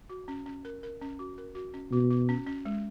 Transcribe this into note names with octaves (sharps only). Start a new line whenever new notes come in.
F#4
C#4
C#4
A#4
A#4
C#4
F#4
A#4
F#4
C#4
B2 F#4
F#4
C#4
C#4
G#3